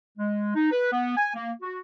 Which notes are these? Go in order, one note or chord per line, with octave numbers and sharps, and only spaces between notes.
G#3
D#4
B4
B3
G#5
A#3
F#4